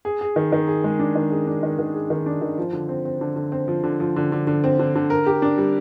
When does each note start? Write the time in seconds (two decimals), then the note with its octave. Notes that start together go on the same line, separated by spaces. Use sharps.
0.05 G#4
0.21 G#4
0.36 D#3
0.52 D#3
0.68 G#4
0.84 G#3
0.99 D4
1.15 D#3
1.31 G#4
1.47 D4
1.63 D#3
1.79 D#3
1.94 G#4
2.10 D#3
2.26 D4
2.41 D#3
2.58 F3
2.73 D3
2.89 C4
3.05 C4
3.21 D3
3.36 D3
3.52 C4
3.68 F3
3.84 D3
4.00 F3
4.16 D3
4.32 D3
4.47 D3
4.64 C4
4.79 D3
4.95 D3
5.10 A#4
5.27 G4
5.42 D4
5.58 G3